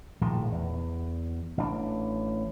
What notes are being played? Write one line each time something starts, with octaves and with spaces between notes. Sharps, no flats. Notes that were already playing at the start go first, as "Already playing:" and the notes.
A#1 A2 D#3 F3
E2
A1 D4